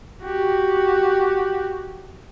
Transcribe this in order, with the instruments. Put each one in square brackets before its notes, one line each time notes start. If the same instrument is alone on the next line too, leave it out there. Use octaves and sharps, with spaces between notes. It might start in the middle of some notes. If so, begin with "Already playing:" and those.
[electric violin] F#4 G4